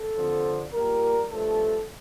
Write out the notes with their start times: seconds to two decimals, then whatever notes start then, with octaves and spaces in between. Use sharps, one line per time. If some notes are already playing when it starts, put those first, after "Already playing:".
Already playing: A4
0.17 D3 F3 C4
0.73 A#2 G3 A#3 A#4
1.29 G2 F3 A3 A4